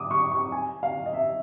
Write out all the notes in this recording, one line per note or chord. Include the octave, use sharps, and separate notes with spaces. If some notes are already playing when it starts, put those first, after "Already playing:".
Already playing: D6 D#6
C#6
C#6
G#5
F5
D#5
E5